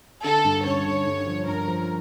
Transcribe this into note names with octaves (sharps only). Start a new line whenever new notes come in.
D3 A4
G2
C#4 C#5
D3
G2
F3
G2 A#4
F3